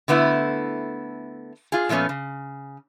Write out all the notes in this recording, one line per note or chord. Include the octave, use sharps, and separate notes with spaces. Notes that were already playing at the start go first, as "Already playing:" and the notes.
D3 A3 B3 E4
F4 G#4
A#2 F3 A3 B3 C#4
C#3